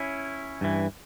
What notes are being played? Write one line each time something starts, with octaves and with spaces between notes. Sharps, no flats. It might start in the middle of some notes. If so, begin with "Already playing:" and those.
Already playing: C#4 E4
G2 E3